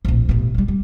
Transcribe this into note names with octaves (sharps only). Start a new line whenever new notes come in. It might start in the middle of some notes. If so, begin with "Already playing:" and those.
D1 A#1
A1 B2
F#3 G3
G3